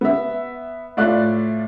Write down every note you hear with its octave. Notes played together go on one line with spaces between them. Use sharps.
B3 E5
A2 F4 D5 E5 F#6